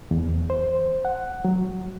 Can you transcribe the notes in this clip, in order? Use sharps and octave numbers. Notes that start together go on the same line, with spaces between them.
E2
C5
F#5
F#3